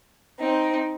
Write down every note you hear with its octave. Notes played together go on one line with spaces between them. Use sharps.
C4 D#4